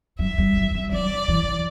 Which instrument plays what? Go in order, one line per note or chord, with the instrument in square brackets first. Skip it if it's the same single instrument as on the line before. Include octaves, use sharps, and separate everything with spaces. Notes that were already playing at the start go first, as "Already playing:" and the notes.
[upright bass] F#3 [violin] E5
[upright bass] G3
F#3
G3
[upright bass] F#3 [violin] D5
[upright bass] E3